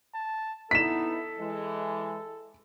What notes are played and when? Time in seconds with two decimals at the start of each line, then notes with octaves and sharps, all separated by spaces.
0.14 A5
0.71 B3 D#4 E4 A4 B6 E7
1.38 E3 G#3